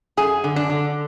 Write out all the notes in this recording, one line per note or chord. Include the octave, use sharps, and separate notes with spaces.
F#2 G#4
D3
D4
D3